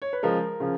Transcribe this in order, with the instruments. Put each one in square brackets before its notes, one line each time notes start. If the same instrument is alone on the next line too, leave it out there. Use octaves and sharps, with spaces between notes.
[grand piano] C#5
B4
C#3 F3 G#3 A#4
C#3 F3